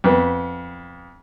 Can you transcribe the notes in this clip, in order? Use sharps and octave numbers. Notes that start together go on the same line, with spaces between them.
F2 B3 B4